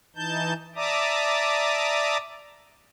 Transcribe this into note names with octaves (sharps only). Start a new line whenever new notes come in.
E3 D#4 A5 G6
D5 E5 A5 A#5 D6 D#6